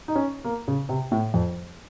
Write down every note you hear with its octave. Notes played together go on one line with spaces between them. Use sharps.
D#4
C#4
A#3
C#3
C3
A2
F2